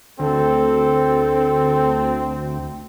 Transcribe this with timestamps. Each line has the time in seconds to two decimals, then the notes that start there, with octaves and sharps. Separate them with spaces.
0.20 D2 C4 A4